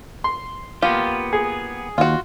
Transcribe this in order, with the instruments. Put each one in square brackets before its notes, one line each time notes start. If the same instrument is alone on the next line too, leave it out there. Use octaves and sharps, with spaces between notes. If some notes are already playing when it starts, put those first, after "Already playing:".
[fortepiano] C6
[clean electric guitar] A#3 B3 G4 [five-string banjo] F4
[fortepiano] G#4
[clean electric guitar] D#2 [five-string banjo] F4 F#4